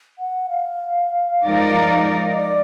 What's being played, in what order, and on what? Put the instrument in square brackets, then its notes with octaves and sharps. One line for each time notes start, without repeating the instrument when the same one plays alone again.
[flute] F#5
F5
[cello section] F3 G#3 D#4 A#4 D5
[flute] D#5
D5